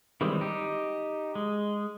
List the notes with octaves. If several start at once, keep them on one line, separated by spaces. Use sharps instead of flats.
D#3 E3 G3 G#3 C4
D#4 G4
G#3